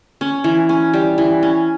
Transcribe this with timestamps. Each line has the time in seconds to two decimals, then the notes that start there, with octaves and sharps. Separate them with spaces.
0.21 C#4
0.44 E3
0.69 C#4
0.93 G3
1.18 E3
1.43 C#4